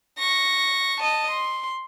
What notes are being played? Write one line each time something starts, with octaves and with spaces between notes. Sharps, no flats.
C#6 A#6
D#5 A5
C6